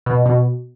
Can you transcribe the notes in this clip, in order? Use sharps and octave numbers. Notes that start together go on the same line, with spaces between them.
B2
B2